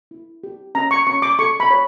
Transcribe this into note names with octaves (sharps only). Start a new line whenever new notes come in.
E4
G4
C#4 A#5
C#6
C#4 C#6
D6
A4 C#6
B5
C#5